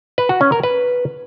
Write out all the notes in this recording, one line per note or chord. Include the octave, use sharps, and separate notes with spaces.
B4
F#4
C#4
A#4
B4